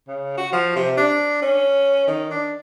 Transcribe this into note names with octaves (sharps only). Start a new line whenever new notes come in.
C#3
F#4
F3
C3
D4
C#4
D#3
D4